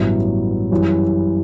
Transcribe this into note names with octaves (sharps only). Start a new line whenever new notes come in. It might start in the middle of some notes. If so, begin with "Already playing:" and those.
Already playing: A1 G2 F#3 B3 E4
F#2 E3 G3